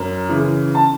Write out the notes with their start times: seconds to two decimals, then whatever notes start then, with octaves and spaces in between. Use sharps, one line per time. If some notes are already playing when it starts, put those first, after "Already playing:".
Already playing: F#2
0.29 C#3 E3
0.75 A5